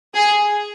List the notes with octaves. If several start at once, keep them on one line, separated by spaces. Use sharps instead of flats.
G#4